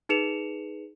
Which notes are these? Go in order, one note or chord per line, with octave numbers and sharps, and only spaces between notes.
D#4 G#4 B4 C#7 E7 F7